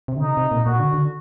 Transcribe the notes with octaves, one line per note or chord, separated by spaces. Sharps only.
C3
D3
C3 D#4
C3
A#2
A#2 F#4
D3
D3